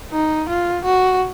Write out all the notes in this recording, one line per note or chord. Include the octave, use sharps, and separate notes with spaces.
D#4
F4
F#4